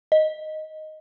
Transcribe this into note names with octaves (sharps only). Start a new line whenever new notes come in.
D#5